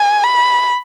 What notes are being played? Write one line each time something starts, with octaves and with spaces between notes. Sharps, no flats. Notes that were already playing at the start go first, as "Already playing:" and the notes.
Already playing: G#5
B5